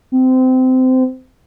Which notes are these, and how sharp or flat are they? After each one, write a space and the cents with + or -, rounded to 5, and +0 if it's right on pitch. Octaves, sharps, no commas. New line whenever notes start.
C4 -25